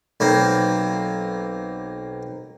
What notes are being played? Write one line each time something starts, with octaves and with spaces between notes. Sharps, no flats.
B1 A#3 C4